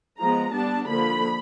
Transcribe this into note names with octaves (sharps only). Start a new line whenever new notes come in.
F3 G#3 B3 A#5
G3 B3 D4 A5
D3 F3 A#3 B5